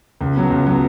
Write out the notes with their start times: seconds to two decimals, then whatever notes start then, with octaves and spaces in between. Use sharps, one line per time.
0.21 C#2
0.36 B2 F#3 B3
0.51 C#2
0.66 B2 F#3 B3